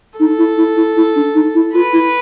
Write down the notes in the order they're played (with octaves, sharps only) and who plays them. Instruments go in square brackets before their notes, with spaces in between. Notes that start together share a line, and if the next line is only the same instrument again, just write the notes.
[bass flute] D#4 [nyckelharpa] A4
[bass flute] E4
E4
E4
E4
D4
D#4
E4
[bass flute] F4 [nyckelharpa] B4
[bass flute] E4